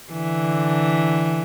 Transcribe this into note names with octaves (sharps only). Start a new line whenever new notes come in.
D3 E3